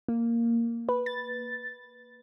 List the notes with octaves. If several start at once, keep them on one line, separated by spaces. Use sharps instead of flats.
A#3
B4
A6